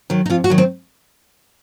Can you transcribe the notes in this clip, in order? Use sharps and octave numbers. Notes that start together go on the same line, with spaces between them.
D#3 F#3
D#4
F2 F4
F#4
D#3 F#3
C4